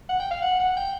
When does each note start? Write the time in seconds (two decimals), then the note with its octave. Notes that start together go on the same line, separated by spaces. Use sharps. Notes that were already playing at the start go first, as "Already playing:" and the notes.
0.09 F#5
0.20 G5
0.31 F5
0.42 F#5
0.59 F#5
0.77 G5